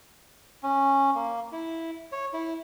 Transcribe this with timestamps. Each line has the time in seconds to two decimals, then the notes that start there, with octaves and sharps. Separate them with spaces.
0.63 C#4
1.15 A#3
1.52 E4
2.12 C#5
2.33 E4